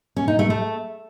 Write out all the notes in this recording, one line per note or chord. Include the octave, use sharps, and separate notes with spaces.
C#4
D#4
A3
A3